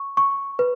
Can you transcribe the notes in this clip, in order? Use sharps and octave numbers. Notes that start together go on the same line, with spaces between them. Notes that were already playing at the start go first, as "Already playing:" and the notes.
Already playing: C#6
C#6
B4